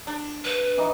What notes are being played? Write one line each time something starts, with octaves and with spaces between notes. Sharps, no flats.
D4
B4
E3 D#4